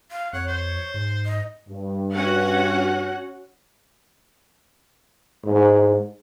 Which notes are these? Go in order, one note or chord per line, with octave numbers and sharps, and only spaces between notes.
F5
F2 C#5 F#5
C5 C#5
G#2
D#5
G2
C#4 F#4 F#5
G#2